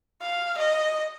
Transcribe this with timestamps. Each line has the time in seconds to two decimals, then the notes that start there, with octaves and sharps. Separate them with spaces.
0.21 F5
0.58 D#5